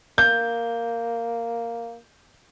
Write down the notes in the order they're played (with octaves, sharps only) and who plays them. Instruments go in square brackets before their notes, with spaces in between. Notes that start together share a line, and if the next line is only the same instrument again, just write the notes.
[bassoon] A#3 [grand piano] G6